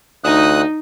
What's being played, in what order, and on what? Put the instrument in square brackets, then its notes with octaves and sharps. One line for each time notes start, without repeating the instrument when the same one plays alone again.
[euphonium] D2 [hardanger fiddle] D#4 [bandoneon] D#6 F#6